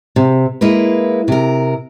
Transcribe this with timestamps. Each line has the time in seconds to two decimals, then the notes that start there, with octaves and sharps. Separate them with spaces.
0.16 C3
0.61 G#3 A#3 E4 B4
1.28 C3 A#4